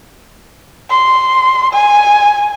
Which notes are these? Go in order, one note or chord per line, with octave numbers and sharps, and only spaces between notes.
C6
G#5